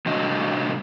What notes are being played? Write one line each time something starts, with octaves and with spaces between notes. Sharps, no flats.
A2 C3 G3 D4 F#4 D#5